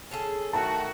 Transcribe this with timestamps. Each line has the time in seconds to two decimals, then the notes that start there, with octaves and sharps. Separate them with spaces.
0.11 C#4 G#4 A4
0.53 D#3 A3 F#4 A5